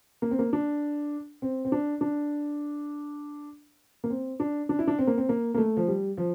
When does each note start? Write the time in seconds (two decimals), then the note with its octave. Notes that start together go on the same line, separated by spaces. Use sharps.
0.22 A#3
0.31 C4
0.39 A#3
0.53 D4
1.42 C4
1.65 C4
1.72 D4
2.01 D4
4.04 A#3
4.10 C4
4.40 D4
4.69 D4
4.79 E4
4.87 D4
4.99 C4
5.07 A#3
5.18 C4
5.29 A#3
5.54 A#3
5.58 A3
5.77 F3
5.88 G3
6.17 F3